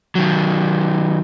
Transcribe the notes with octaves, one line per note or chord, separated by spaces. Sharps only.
D#3 F#3